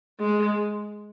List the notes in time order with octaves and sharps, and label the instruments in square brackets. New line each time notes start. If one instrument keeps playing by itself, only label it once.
[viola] G#3